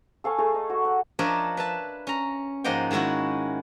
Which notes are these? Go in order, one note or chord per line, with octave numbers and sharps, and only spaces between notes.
A4 F5 G#5 C#6
A3 G#4 A4 A#5
D#5
F#4
F#5
F3 D4 A#4 C#5 D#5 E5
B4 E5 A5
C#4 A#5
G#2 F3 A#3 D#5 F#5 G5
D#3 G#3 C#4 E4 F#4